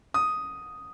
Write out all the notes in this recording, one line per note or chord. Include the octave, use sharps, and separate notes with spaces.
D#6